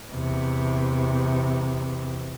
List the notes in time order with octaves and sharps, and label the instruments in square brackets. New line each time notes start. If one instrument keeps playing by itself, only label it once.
[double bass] E2 C3